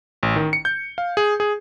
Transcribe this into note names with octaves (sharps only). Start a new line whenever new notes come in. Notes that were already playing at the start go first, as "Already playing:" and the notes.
A1
D#3
C#7
G6
F5
G#4
G#4